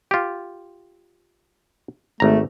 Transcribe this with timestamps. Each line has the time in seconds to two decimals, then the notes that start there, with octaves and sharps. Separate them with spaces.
0.11 F4 G4
2.20 G#1 A3 A#5